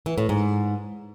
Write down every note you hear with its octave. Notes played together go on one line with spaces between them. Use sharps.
E3
A2
G#2